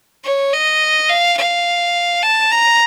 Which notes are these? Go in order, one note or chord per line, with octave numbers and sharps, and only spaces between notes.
C#5
D#5
F5
F5
A5
A#5